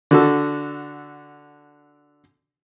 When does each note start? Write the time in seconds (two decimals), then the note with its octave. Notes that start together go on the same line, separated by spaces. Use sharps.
0.11 D3 F#4 A4